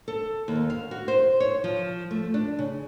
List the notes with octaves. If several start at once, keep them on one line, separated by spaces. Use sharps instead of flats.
A4
D#2
F5
F#4
C5
C#5
F3
A3
D4
C#3